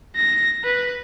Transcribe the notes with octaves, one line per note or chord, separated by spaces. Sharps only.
A#6
B4